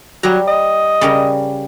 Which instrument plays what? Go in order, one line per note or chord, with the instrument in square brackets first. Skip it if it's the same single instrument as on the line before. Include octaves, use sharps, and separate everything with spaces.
[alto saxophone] F#3 [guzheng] G3 A#5
[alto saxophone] D#5
[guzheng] C#3 G3 A#4